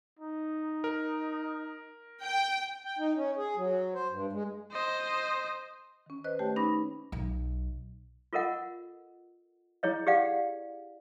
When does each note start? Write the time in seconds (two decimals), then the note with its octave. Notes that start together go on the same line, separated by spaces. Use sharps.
0.19 D#4
0.84 A#4
2.21 G5
2.85 G5
2.99 D#4
3.16 C#4
3.37 G#4
3.56 F#3
3.94 C5
4.10 G2
4.32 G#3
4.72 C5 D#5
6.06 D#3 C#4
6.24 B4 C5 D#5 F#6
6.39 A3 G4 C#5 G5 A5
6.56 C#4 D#4 B5 D6 A#6
7.12 B1
8.33 F4 A4 A#4 D#5 F#5
9.83 E4 G#4 C#5 D#5
10.07 G4 G#4 D5 F5 F#5